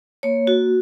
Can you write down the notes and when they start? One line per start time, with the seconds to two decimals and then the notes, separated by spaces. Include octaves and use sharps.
0.23 A#3 C#5
0.47 F#4